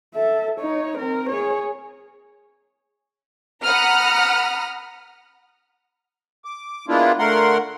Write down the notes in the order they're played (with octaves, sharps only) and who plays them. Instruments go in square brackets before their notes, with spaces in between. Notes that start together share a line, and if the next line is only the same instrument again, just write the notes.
[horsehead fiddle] A4 E5
D#4 C#5
C4 A#4
G#4 C#5
[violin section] F#5 A#5 B5 D#6 F6
[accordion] D6
G#3 A#3 B3 D4 E4 F4
D3 A3 A#4 F#5 C6